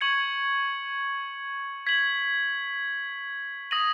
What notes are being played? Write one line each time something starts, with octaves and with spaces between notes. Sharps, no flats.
C#6 G#6 C#7 F#7
G#6 B6 F#7
D#6 A#6 D#7 F#7